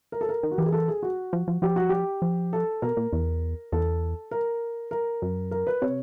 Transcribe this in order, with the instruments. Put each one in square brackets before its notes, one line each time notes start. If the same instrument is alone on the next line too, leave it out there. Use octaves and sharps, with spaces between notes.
[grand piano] A#4
A4
A#4
[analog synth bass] D#3
[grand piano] F#4
[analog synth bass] E3 [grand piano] G4
[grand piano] G#4
A4
G#4
F#4
[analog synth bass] F3
F3
[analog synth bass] F3 [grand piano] G4
[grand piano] F#4
G4
[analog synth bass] F3
[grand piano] A4
[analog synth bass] B2 [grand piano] A#4
[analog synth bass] A#2
E2
[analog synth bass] E2 [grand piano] A4
[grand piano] A#4
A#4
[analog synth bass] F#2
[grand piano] A#4
B4
[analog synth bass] C3 [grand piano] C#5